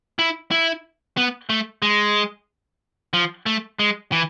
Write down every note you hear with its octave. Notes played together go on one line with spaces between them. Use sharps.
E4
E4
B3
A3
G#3
F3
A3
G#3
E3